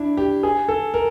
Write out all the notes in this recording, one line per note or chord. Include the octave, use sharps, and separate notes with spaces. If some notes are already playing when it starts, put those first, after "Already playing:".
Already playing: D4 E4
G4
G#4
A4
A#4